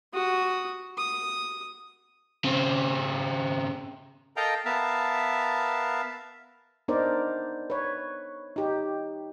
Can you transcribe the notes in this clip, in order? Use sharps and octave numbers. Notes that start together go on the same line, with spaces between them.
F#4 D#6
D#6
C#3 C4
A4 A#4 D#5 F5 G5 A#5
B3 A#4 E5 F5 A5
B3 D4 D#4 A#4 C5 D5
B4 C#5
D#4 G4